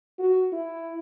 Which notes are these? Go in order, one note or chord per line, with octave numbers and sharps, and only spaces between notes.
F#4
E4